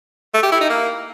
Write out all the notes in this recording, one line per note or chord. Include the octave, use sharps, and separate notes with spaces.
A3
G4
E4
D#4
A#3